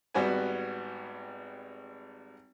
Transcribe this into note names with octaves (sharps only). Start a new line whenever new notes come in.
G#1 G3 B3 F#4 B4 G#5